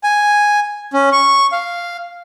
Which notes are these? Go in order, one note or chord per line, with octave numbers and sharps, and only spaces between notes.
G#5
C#4
C#6
F5